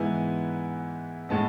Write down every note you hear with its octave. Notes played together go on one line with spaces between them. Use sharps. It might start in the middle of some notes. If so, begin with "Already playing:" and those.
Already playing: G#2 E3 B3 E4 G#5
A2 G#3 B3 A5